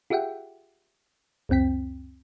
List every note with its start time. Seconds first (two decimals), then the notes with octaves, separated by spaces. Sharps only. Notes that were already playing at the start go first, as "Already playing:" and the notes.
0.10 F4 G4 G#4 E5 F#5 G5
1.49 C#2 F#2 C4 G5 B6